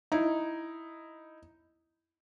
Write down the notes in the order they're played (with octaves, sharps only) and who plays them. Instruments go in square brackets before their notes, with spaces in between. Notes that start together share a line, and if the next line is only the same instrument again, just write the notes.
[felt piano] D#4 E4